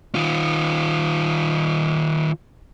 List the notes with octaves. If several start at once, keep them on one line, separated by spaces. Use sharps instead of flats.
D#3 F4